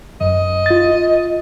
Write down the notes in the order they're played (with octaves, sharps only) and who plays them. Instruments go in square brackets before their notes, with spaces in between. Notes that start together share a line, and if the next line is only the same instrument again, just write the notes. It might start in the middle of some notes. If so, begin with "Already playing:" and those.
[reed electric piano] F#2 [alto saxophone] D#5
[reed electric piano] F4 A6